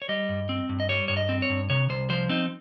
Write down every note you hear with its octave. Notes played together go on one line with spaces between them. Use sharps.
C#5
G3 D#5
G2
C4
G2
D#5
G3 C#5
G2 C#5
D#5
C4
C#5
G2
C3 C#5
C2 C5
F3 C5
C4 D#4